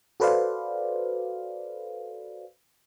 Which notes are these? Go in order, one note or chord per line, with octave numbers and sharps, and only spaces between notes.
F#4 A4 B4 C5 D5 F5